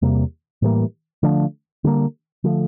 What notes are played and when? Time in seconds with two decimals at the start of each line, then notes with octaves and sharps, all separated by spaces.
0.02 E2 C3 G3 A#3
0.62 A2 E3 G3 A#3
1.23 D3 F3 A3 D4
1.84 D3 G3 A#3
2.44 D3 F3 A3